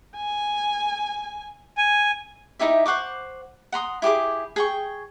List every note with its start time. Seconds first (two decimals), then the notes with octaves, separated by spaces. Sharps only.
0.17 G#5
1.77 G#5
2.59 D#4 E4 G4 E5
2.86 C5 F#5 C#6 D6
3.72 F#5 A#5 C6 D#6
4.02 E4 G4 G#4 D6
4.56 G#4 G5 C#6